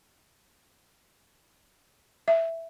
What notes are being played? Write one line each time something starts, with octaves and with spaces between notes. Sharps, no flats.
E5